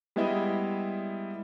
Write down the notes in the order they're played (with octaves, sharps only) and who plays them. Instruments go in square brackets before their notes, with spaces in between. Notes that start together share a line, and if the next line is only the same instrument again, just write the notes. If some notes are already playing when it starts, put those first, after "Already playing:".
[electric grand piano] G3 G#3 B3 E4 D#5 E5